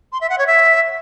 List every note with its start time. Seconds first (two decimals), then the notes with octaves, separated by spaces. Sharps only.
0.12 C6
0.21 E5
0.30 F#5
0.38 C#5
0.47 E5